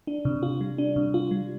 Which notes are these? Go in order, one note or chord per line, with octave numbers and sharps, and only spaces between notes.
D4
C3
F4
G3
D4
C3
F4
G3